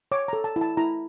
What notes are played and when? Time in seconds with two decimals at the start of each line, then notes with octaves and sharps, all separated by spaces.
0.12 C#5 D6
0.28 A4 A#5
0.44 A5
0.56 E4
0.61 A5
0.77 E4 A#5